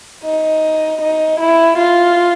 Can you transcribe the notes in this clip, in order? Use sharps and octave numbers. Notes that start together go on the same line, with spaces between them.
D#4
D#4
E4
F4